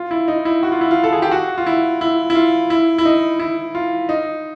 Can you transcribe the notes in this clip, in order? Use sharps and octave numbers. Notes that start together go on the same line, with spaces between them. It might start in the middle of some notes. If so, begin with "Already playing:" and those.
Already playing: F4
E4
D#4
E4
F#4
F4
E4
F4
A4
G#4
G4
F#4
F4
E4
E4
E4
F4
E4
E4
D#4
E4
F4
D#4